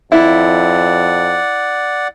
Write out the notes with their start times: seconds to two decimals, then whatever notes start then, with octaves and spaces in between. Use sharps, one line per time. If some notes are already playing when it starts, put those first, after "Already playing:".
0.12 F2 E4 D5 F#5